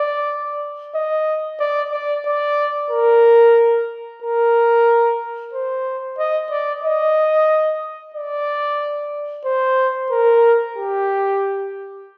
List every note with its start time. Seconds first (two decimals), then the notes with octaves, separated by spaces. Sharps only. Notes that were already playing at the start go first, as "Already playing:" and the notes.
Already playing: D5
0.95 D#5
1.60 D5
1.92 D5
2.26 D5
2.90 A#4
4.22 A#4
5.53 C5
6.18 D#5
6.51 D5
6.84 D#5
8.14 D5
9.45 C5
10.10 A#4
10.76 G4